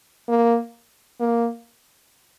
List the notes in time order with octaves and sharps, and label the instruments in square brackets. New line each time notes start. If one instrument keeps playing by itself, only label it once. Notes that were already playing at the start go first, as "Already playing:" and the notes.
[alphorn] A#3
A#3